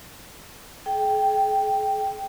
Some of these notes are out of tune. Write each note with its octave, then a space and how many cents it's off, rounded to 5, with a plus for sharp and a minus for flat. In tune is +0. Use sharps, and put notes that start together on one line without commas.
G#4 +40 G5 +0